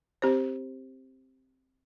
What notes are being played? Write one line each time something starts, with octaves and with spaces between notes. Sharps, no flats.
C4 G4 C5